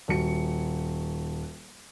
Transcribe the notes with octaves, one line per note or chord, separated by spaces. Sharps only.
D#1 F#4 C#7